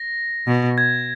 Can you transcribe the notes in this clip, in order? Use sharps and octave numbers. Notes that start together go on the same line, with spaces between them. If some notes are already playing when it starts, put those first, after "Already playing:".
Already playing: A#6
B2
G#6